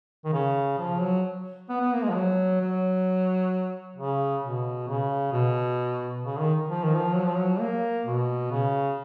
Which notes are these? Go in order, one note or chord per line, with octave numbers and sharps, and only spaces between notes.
D#3
C#3
F3
F#3
B3
B3
A#3
G#3
F3
F#3
F#3
C#3
B2
C#3
B2
C#3
D#3
F3
D#3
F3
F#3
F3
F#3
A#3
B2
C#3